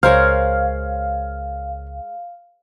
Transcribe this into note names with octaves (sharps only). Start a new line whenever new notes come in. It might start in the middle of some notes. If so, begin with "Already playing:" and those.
C#2 G#3 A#4 C5 C#5 F5 F6